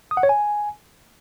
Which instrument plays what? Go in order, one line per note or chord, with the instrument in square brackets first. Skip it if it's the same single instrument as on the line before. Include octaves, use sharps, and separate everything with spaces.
[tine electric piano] D#6
F#5
C#5
G#5